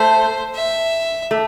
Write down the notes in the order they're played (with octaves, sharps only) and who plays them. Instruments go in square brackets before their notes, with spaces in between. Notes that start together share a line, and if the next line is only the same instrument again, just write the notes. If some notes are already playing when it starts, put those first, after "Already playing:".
Already playing: [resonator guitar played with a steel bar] A3 [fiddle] C5
[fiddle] E5
[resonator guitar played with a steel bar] A3